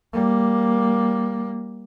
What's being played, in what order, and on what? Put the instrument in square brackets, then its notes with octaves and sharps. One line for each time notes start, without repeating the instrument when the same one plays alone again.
[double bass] G3 A#3